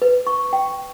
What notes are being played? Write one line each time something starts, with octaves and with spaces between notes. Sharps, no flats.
B4
C#6
G5